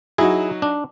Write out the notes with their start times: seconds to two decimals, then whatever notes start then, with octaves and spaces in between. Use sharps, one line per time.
0.18 F#3 D#4 E4 F#4 G#4
0.62 D4